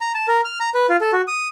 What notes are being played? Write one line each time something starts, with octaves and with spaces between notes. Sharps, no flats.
A#5
A5
A#4
F6
A#5
B4
F4
A4
F#4
D#6